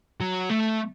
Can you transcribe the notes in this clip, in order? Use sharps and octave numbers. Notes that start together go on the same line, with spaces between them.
F#3
A3